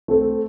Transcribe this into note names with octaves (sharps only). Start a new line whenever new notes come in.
A3 C4 A4 C5